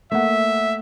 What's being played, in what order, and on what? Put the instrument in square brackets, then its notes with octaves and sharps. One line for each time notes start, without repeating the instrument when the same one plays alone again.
[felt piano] A3 A#3 F#5 [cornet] E5